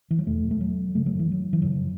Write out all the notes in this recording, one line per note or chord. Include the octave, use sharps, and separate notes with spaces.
E3
F#3
E2 B2 A3
A3
F#3
F#2 C#3 A3
F#3
E3
F#3
E3
F#2 C#3 F#3